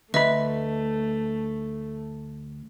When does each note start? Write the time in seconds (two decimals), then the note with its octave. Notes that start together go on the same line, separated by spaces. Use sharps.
0.14 D2 A3 B4 D#5 E5 B5